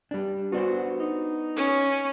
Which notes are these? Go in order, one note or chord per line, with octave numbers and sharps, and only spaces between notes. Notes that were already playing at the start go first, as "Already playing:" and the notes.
G3 D4
B3 D4 F#4 C5
D#4
C#4